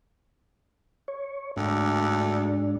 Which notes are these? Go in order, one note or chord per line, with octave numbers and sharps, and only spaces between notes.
C#5
D2 G#2 D4